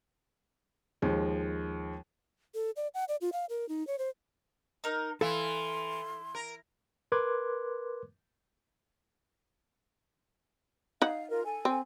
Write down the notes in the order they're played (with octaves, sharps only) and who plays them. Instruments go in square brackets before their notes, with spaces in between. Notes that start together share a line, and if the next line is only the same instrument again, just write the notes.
[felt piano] D#2 F3 G#3
[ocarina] A4
D5
F#5
D5
F4
F5
A#4
D#4
C#5
C5
[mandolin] D#4 A#4
[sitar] E3 [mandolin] E4 [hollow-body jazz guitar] A4 F5 [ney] C6
[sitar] A#4
[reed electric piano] A#4 B4 C6 D6 F#6 G#6
[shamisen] D#4 F#5 [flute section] F5
[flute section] F4 A#4
A4 G#5
[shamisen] C4